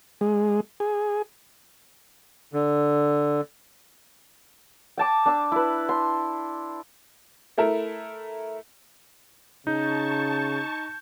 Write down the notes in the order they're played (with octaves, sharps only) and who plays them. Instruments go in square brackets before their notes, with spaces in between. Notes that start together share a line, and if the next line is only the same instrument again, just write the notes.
[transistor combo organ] G#3
G#4
[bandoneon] D3
[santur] G5 A5 D6
D4 E6
E4 B4
C6
[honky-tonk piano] A3 E4 A#4
[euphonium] C#3 [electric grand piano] D#4 [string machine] A5 C#6 [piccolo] G6